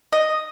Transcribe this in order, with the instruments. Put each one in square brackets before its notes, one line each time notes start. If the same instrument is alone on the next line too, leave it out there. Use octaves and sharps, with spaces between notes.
[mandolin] D#5